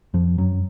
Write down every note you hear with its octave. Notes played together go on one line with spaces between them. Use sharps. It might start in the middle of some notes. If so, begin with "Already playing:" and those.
F2 F3
F#2 F#3